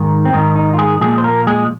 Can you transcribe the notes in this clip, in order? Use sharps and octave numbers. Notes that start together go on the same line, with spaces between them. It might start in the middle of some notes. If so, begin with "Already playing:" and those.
Already playing: G#2 D#3
C4
G#2 D#3 D#4
D#4
F4
G#3 G#4
A#2 F3 G#3 G#4
C5
A#3 A#4
G#3 G#4